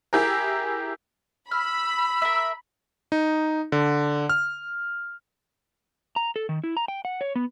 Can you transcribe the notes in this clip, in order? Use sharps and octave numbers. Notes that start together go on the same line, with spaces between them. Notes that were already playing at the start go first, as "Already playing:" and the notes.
E4 G4 G#4 A#4
B5 E6 F6
A#4 E5
D#4
D3
F6
A#5
A4
D#3
E4
A#5
G5
F#5
C#5
B3